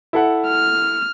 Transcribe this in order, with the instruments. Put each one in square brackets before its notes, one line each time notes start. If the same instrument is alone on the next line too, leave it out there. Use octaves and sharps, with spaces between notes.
[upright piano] E4 A4 F#5
[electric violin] F6